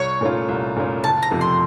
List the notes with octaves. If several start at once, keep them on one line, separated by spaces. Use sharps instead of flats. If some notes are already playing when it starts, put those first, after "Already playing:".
Already playing: C2 C#5
A#2 A3 C#4 F4
C2
A#2 A3 C#4 F4
F#1 A5
A#5
F2 C3 F3 A3
C6